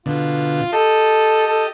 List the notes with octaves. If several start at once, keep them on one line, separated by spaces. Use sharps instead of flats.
B2 D3 F4
G4 A4 D#5
A4